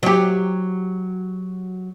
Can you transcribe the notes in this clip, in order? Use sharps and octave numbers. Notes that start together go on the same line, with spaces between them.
F#3 G4